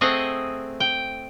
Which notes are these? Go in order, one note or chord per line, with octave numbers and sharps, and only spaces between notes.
A3 C4 G#4 D#5 F#5
G5